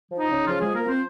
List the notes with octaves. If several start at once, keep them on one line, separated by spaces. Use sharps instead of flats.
F3
D#4
C#3
C#3 F3 F4
F3 G#3 G#4
A#3 A#4
F3 C4 C5